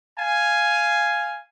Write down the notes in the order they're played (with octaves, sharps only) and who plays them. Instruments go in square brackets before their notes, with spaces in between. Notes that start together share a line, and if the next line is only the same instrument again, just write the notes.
[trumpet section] F5 G#5